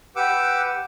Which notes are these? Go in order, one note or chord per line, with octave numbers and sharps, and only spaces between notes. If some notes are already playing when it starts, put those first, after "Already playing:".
G4 B4 F#5 D6 E6